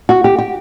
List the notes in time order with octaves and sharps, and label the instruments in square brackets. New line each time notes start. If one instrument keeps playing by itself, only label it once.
[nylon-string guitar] F#4
G4
G4